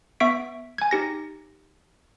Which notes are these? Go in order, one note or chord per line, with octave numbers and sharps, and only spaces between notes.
B3 E5 C#6 B6 D7
G#5 G#6
D#4 G4 A#6